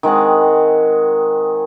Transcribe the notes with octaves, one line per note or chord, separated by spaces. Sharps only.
D#3 G#3 C4 F#5